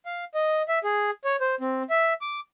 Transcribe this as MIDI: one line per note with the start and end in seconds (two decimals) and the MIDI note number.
0.06 0.25 77
0.34 0.62 75
0.68 0.79 76
0.84 1.11 68
1.24 1.36 73
1.40 1.55 72
1.61 1.83 60
1.90 2.13 76
2.21 2.40 86